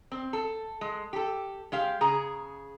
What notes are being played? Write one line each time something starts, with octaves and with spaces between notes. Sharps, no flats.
C4
A4
G#3
G4 A4
G#3 G4 F5
C#3 G#4 A#5